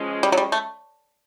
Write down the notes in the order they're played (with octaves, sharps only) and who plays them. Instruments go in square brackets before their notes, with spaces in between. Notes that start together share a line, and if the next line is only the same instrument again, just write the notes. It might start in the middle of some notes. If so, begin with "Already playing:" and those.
Already playing: [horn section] F3 G#3 C#4
[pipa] G3
F#3
G3
A3